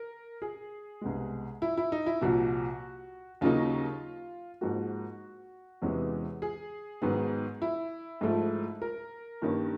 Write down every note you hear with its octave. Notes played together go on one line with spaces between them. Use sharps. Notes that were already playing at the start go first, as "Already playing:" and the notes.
Already playing: A#4
G#4
C2 B2 G#3
E4
E4
D#4
E4
C2 A#2 F3 F#4
D#2 C#3 F#3 A#3 D#4 F4
G#2 F3 A#3 F#4
E2 C3 E3 G#3 C#4
G#4
G#2 D#3 F#3 B3
E4
G#2 F3 A3
A#4
G2 D#3 G3 A#3 C#4